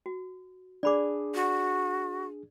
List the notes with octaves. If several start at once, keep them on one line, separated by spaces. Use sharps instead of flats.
F#4
D4 G#4 D5 B5 D6
F#4